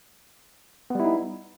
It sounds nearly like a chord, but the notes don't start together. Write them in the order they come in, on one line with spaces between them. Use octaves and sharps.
B3 G3 E4 D#4